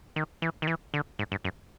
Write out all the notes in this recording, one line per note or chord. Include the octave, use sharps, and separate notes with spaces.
D#3
E3
D#3
E3
D3
G#2
G2
F#2